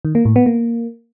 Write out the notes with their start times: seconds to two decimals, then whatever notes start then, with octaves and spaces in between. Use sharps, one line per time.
0.05 D#3
0.15 A#3
0.25 A2
0.36 B3
0.46 A#3